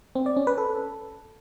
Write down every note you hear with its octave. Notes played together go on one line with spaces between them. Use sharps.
C4
D5
C#4
B4
A4